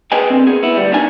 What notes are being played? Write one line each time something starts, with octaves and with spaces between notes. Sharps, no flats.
G#4 B4 D#5 G5 G#5
D3 C4
B3 G#4
B3 E4
D2 G3
B3 D4 D#4 G#5